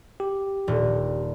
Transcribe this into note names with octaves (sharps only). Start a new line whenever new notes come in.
G4
D#1